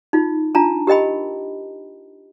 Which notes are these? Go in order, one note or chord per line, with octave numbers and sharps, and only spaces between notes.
D#4 F4
D4 F4 A5 A#5
G4 A#4 D#5 G5 B5